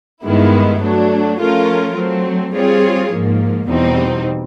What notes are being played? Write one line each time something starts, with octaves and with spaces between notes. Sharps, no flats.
G2 D#3 G#3 B3 E4
F#3 A3 D4
F3 A3 C#4 F4 A#4
F#3 A3 C4
G3 C4 F4 G#4 C#5
G#2 F3 A#3
E2 B2 G3 C4 D#4